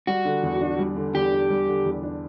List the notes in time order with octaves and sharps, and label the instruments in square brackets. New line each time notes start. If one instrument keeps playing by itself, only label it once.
[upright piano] G3 [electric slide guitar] F#4
[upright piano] D3
E2
D4
G3
D3
[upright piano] E2 [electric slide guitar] G4
[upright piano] D4
G3
D3
E2
D4